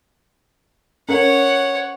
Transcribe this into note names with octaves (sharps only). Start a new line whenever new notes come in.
C#4 A4 A#4 C#5 F#5